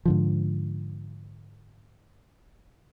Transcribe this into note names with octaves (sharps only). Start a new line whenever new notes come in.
G#2 D3 F3